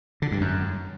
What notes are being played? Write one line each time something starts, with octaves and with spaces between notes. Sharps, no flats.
D3
G2
F#2